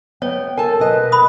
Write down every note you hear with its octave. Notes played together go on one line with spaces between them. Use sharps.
B3 C#5 G5
A4 A#4 G#5 A5
B2 B4 D#5
B5 D#6